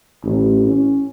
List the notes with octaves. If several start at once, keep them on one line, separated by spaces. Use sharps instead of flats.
A1
C#4